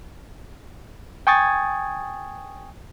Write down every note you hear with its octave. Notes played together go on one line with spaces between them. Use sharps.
G5 G#5 C#6 D#6 G#6 A6